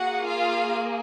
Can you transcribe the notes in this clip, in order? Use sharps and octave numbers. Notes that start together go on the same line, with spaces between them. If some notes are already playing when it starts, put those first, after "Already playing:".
Already playing: A#3 F#4 G#4 F#5
F4 F5